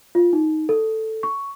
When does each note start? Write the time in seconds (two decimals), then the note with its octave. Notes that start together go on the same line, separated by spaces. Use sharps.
0.15 F4
0.33 D#4
0.69 A4
1.23 C#6